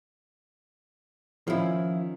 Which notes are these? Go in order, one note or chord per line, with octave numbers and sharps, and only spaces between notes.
D#3 F3 C#4 E4